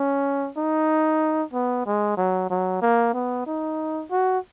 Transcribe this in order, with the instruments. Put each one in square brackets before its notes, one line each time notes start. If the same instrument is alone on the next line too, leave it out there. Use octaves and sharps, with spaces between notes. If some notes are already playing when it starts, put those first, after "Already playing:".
Already playing: [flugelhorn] C#4
D#4
B3
G#3
F#3
F#3
A#3
B3
D#4
F#4